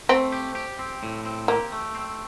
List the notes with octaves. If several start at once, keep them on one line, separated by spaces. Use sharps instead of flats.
A3 C4
G4
G4
C4
A2
C4
A#3 G4
A3
C4